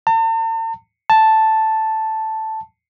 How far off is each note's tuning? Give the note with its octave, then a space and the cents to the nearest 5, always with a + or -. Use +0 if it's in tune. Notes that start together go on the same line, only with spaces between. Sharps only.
A5 +45
A5 +0